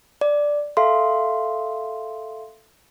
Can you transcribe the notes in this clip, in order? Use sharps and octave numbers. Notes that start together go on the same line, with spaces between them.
D5
A4 E5 F5 C6